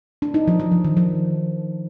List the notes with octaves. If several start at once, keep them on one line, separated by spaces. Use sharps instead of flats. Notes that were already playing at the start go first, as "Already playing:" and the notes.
D4
D#4
F3
F3
F3
D#3
F3